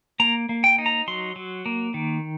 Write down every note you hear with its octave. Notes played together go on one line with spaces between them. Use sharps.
A#3 A#5
A#3
G5
D#4
A#5
F#3 C6
F#3
A#3
D#3